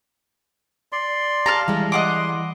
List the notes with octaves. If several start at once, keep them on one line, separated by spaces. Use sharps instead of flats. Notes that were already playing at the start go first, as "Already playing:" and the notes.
D5 C6
G4 F5 A5 A#5
E3 G3 G#3
D#5 F#5 C6 D6